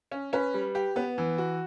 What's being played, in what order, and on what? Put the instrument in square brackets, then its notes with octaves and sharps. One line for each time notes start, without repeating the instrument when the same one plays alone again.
[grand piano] C#4
[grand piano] C#4 [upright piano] B4
[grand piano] G3
G4
[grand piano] B3 [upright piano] B4
[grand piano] E3
F#4